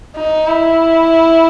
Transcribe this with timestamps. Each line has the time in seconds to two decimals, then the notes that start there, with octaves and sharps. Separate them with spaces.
0.17 D#4
0.47 E4